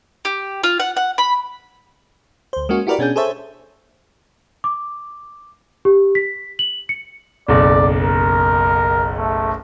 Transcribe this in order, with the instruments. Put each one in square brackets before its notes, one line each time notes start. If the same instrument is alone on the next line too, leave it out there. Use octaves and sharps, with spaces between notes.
[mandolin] G4
F4
F#5
F#5
B5
[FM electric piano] D2 C5
G#3 A#3 C#4 F#4 G#4
E4 F#4 G4 A#4 B4 D5
B2 C#4 D4 G#4 G6
G#4 A4 C5 C#5 E5 A5
[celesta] D6
G4
B6
F#7
C#7
[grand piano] F#1 B1 [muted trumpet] D5
[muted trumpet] A#4
A3